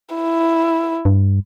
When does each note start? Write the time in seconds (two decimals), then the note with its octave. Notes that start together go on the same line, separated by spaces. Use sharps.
0.15 E4
1.05 G2